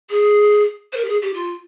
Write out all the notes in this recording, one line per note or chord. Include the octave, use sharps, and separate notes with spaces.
G#4
C5
A#4
G4
G#4
G4
F4